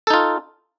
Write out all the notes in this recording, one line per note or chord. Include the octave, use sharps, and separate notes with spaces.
D#4 F4 A4